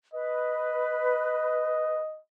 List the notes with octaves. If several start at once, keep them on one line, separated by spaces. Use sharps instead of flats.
B4 D#5